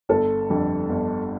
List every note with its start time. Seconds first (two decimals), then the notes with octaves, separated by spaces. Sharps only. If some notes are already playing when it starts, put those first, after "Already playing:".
0.09 G1 A4
0.50 F2 D3 G3
0.89 G1